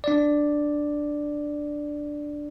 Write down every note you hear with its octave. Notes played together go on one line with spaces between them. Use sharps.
D4 D5